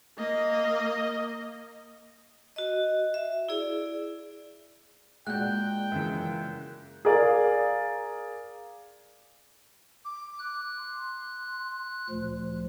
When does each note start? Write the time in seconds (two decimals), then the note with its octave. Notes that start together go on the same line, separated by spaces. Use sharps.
0.18 A#3 D#5
2.56 F#4 D#5
3.14 E5
3.49 E4 G#4 D5
5.27 A#2 G#3 D4 F#4 G5 F#6 G6
5.92 F#2 C#3 E3
7.05 G#4 A#4 D5 F5
10.05 D6
10.38 F#6
10.78 C6
12.10 D2 A#2 F3